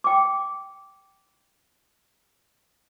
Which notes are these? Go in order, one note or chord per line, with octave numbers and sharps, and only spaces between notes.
G5 D6